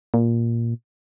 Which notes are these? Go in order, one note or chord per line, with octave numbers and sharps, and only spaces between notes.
A#2